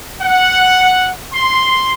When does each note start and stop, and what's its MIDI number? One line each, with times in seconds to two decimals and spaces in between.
0.21 1.10 78
1.33 1.91 84